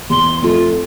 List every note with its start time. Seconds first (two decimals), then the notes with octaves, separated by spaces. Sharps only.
0.10 E2 C6
0.42 F2 A3 F4